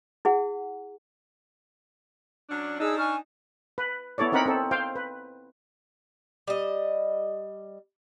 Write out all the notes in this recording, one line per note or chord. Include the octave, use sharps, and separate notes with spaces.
E4 G#4 F#5
F#3 C#4 D4
D4 D#4 G#4 E6
G#5 C#6 F6
B4
B3 E4 A4 C#5 D5
C4 D#4 A#4 F#5 B5
C4 A4
C5 F5 G5
B4
G3 D#5